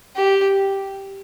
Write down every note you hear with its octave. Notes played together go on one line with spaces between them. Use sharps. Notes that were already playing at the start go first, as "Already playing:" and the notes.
G4